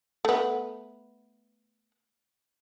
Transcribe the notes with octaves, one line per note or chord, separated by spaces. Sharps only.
A3 B3